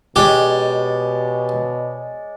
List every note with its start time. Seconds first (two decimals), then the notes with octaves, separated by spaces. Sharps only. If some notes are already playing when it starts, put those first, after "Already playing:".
0.16 B2 G#3 G4 C#5 D5